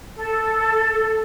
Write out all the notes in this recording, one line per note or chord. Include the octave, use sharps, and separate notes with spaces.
A4